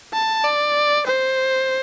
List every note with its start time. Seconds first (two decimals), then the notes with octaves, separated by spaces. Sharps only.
0.14 A5
0.44 D5
1.07 C5